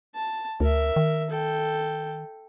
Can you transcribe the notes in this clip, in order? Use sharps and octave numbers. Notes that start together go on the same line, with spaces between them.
A5
D2 A#4 E5
D#3
A4 G5